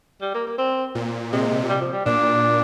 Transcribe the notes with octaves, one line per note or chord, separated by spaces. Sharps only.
G3
A#3
A#3
C4
A#2
C3 G#3
G3
F3
G3
A#2 D4